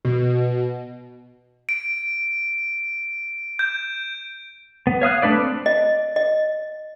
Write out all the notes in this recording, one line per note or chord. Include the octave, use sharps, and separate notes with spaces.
B2
D7
G6
B3
C#5 F5 D#6 F#6
A3 D4 B4 D5
C4
D#5
D#5